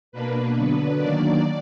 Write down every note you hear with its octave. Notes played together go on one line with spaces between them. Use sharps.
B2 A#3 D4 B4
D3 F#3 B3 D4 B4
D#3 F#3 A#3 D4 D5